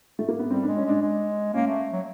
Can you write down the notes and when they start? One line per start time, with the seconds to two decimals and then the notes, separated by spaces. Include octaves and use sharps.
0.19 A3
0.28 A#3
0.39 B3
0.50 G3 C4
0.63 D4
0.67 G#3
0.77 C#4
0.85 G#3 D4
1.02 G#3
1.53 A#3 C#4
1.67 A3
1.93 F#3